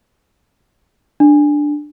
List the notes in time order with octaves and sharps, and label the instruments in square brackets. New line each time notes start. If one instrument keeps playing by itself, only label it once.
[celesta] D4